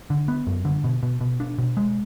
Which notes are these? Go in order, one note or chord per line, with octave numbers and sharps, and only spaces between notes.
D3
B3
F#2
D3
B2
B2
B2
D4
B2
G#3